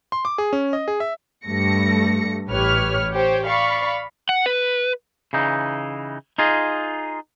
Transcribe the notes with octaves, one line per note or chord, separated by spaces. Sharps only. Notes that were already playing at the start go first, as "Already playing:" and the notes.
C6
D6
G#4
C#4
D#5
G#4
E5
G2 G3 A3 A#6 C#7
A1 G4 B4 C#5 F6
G4 C5 C#5 G5
D5 F5 B5 C#6
F#5
B4
C#3 E3 D#4
D#4 F4 G#4 D#5